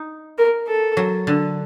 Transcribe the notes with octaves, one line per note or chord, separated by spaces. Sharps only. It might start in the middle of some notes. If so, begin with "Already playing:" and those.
Already playing: D#4
A#4
A4
F#3
D3